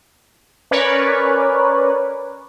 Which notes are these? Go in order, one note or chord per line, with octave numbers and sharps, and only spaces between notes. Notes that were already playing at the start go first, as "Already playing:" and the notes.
C#4 A#4 B4 C#5 D5